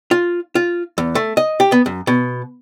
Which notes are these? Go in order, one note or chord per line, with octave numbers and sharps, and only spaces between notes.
F4
F4
E2
A3
D#5
G4
B3
F#2
B2